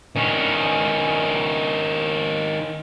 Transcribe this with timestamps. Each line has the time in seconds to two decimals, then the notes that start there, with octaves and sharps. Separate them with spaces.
0.16 D#3 C#4